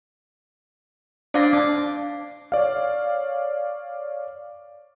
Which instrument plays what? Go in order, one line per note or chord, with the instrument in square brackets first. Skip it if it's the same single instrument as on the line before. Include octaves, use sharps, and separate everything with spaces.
[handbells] D4 F5 A#6 [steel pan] C5 D5
[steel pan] D4 [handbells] D6
[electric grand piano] C#5 D5 F5